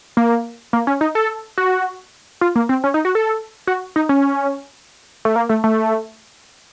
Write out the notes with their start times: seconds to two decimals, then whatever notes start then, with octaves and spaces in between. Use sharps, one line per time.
0.17 A#3
0.73 A#3
0.87 C#4
1.01 D#4
1.15 A4
1.58 F#4
2.41 F4
2.56 A#3
2.69 C4
2.84 C#4
2.94 D#4
3.05 F#4
3.15 A4
3.67 F#4
3.96 D#4
4.09 C#4
5.25 A3
5.36 A#3
5.49 A3
5.64 A3